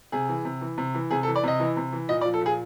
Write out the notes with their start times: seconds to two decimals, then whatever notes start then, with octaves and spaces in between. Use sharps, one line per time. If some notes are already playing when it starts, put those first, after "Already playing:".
0.12 C3 G#4
0.29 E3
0.45 C3
0.61 E3
0.78 C3
0.95 E3
1.11 C3 G#4
1.23 A4
1.28 E3
1.36 D5
1.44 C3 D#5
1.60 E3
1.77 C3
1.93 E3
2.09 A#2 D#5
2.21 D5
2.25 F3
2.34 A4
2.41 A#2 G#4